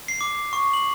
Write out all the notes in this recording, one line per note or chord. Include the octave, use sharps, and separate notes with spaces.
C7
D6
C#6
F#7